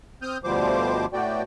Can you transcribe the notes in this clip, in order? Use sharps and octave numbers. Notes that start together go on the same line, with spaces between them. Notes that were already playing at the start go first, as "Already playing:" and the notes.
C4 D#6 F6 G6
D2 B2 F3 G3 C5 D6
A2 A3 B3 F#4 D5 G5